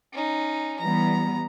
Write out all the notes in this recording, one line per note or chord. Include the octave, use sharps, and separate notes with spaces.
C#4 D#4
E3 G3 B3 A#5